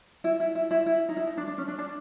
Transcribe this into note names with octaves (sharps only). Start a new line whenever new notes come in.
E4
E4
E4
E4
E4
D#4
E4
D#4
D4
D4
C#4
D4
D4